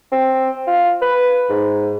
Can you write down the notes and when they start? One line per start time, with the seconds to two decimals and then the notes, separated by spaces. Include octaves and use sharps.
0.12 C4
0.67 F4
1.02 B4
1.50 G#2